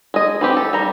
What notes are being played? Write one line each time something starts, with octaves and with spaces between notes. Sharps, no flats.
G#3 D#5
E3 C4 G4
A4
G3 A#5